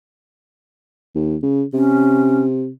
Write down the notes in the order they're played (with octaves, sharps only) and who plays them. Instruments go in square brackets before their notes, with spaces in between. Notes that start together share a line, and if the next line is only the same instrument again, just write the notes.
[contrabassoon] D#2
C#3
[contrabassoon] C3 [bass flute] C#4